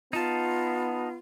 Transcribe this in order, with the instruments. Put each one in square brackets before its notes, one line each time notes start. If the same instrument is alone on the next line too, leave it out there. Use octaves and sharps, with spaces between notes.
[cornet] B3 [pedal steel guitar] D#4 A5 [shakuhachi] F4